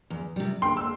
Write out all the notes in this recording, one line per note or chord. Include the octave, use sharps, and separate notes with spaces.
E2
C3 G3
D2 G5 C6
E6